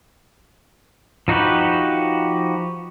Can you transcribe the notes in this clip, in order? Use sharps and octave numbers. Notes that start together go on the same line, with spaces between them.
F3 D#4 F#4 G4 B4